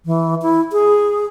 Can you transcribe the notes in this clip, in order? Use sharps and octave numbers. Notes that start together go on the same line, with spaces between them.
E3
E4
G#4